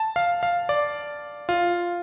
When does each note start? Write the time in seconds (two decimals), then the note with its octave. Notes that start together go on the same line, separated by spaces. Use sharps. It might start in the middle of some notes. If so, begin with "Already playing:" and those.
Already playing: A5
0.16 F5
0.43 F5
0.69 D5
1.49 F4